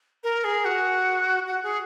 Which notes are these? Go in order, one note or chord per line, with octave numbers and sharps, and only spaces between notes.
A#4
G#4
F#4
F#4
G#4